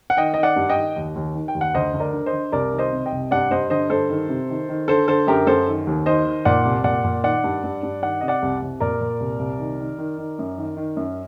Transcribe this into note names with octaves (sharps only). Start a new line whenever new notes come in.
F#5
D#3 D#5 G5
D#3 D#5
D5 F#5
G2
D#5 G5
D#3
D#2
D#2
D#3
G5
D#2
F#5
D2 C5 D#5
D2
A#4 D5
D3
C5 D#5
D3
C2 A#4 D5
D#3
C5 D#5
C3
D#5 G5
C2
G2 D5 F#5
G2 C5 D#5
D3 C5 D#5
G2 A4 C5
D#3
C3
D#3
D#3
D3 A4 C5
D3 A4 C5
F#2 G4 A#4
F#2 A4 C5
D#3
D#2
D#3 C5 D#5
D#3
A#2 D5 F#5
C2
A#2 D5 F#5
A#2
D#3 D5 F#5
G2
G2
G2
D#3 D5 F#5
C3 D#5
D5 F#5
C2
C2
A#2 A#4 D5
A#2
C2
C2
D#3
D#3
D#3
D#3
F#2
D#3
D#3
F#2